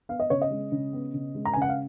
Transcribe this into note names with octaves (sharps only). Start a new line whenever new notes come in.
B3 F5
D#5
C#3 C#5
D#5
G#3
C#3
B3
C#3
G#3
A#5
G#5
C#3
F#5
F5